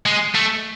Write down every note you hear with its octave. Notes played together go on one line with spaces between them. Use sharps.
G#3
A3